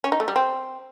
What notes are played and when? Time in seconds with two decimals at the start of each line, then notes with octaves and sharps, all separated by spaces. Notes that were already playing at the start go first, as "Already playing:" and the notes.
0.04 C#4
0.12 D#4
0.20 A3
0.28 G3
0.36 C4